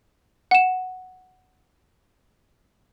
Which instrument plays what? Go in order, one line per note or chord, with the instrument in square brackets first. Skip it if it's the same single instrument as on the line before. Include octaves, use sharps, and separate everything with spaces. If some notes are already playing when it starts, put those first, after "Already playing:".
[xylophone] F#5 E7